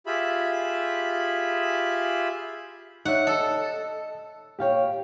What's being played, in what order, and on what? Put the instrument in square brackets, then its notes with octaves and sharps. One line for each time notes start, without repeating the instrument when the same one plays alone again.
[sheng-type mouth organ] F4 G4 G#4 E5 B5
[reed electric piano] D#4 E5 [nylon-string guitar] G4 C#5 D5 [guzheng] F#5
[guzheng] A4 [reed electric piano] D#5 E6
[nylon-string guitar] A#2 E4 C#5 [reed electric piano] G4 F5 G5